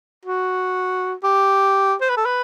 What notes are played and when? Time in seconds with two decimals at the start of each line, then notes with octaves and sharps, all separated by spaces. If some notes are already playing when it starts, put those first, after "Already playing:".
0.25 F#4
1.23 G4
2.01 C5
2.09 B4
2.17 A4
2.25 B4